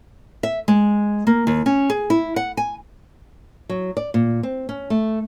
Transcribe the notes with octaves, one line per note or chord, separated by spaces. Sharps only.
E5
G#3
A#3
D#2
C#4
G#4
E4
F#5
G#5
F#3
D5
A#2
C4
C#4
A3